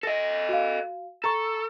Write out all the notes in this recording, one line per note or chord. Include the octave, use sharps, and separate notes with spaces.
A4 D#5 A#6
F#4 F5
A4 A#5 C#6